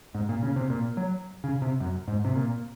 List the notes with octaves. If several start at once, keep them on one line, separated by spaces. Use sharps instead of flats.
G#2
A#2
C#3
C3
A#2
F#3
C#3
C3
F#2
G#2
C3
A#2